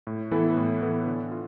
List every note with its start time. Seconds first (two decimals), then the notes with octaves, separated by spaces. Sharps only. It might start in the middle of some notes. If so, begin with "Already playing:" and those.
0.07 A2
0.31 E3 B3 E4 A4
0.57 A2
0.82 E3 B3 E4 A4
1.07 D3
1.31 F4